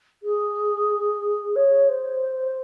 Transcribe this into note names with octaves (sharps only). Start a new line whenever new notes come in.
G#4
C#5
C5